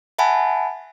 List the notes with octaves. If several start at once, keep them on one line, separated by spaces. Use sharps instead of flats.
E5 F#5 G#5 A5 B5